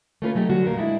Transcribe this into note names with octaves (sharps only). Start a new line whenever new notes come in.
A3 A#3 C#4 F4 G4 B4
F#3 A3 D#4 G4
D3 F#3 G3 F#4
E2 A#2 A#4 F5
G#3 D4 E4